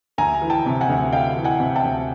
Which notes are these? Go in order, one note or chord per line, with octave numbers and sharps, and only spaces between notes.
D2 G#5 A#5
E3
G5 A5
C3
F#5 G#5
D2
D2 F5 G5
E3
F#5 G#5
C3
G5 A5
D2